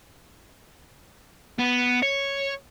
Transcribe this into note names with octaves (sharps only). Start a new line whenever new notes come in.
B3
C#5